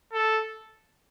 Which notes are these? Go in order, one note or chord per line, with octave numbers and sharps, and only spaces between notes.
A4